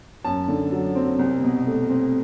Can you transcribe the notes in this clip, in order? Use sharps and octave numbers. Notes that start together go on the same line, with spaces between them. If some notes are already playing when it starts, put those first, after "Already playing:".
F#2 A5
D3
F#3
C4
C2
B2
A3
C4